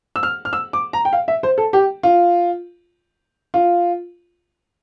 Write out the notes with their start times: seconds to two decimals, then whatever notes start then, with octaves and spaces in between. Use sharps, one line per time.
0.16 E6
0.23 F6
0.45 F6
0.53 E6
0.73 D6
0.93 A#5
1.05 G5
1.13 F5
1.28 E5
1.43 C5
1.58 A4
1.73 G4
2.03 F4
3.54 F4